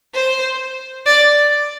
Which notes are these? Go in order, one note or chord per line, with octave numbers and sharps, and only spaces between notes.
C5
D5